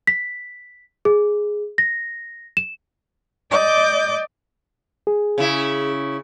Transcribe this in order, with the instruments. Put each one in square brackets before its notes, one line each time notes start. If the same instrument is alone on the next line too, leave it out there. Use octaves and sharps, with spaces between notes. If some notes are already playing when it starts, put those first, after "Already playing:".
[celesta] B6
G#4
A#6
E7
[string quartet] D5 D#5 D6 G6
[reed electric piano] G#4
[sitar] C#3 E4